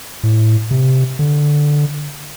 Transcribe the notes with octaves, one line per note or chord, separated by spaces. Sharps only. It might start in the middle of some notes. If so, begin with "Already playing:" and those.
A2
C3
D3